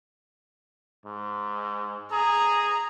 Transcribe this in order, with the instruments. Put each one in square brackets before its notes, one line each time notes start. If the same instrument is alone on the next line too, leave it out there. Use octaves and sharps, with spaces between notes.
[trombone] G#2
[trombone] G#4 [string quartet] A#5